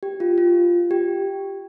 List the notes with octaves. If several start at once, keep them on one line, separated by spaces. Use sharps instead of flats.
G4
F4
F4
G4